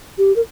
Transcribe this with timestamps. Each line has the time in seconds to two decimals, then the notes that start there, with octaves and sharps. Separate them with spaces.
0.18 G4
0.36 A#4